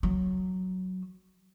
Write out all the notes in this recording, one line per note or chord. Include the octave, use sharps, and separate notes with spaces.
F#3